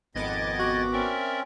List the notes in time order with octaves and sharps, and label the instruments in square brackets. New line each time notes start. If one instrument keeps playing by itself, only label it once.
[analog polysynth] G#1 B3 D6 [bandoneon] F2 [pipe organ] D#5 G#6 A6
[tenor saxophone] F#4
[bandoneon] C4 C#4 [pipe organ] A#4 D5 E5